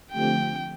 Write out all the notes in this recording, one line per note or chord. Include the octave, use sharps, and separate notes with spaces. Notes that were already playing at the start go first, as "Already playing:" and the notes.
D3 F3 A3 C4 G4 G5